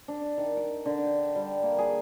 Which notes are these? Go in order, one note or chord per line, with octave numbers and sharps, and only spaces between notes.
D4
D#3
D6
D3
G5
G3
A#3
G#4